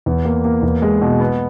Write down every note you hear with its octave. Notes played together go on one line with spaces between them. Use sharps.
E2
A#3
A#3
E2
G#3
B2
B3